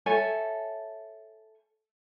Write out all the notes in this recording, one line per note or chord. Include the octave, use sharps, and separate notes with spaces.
A4 C#5 E5 G#5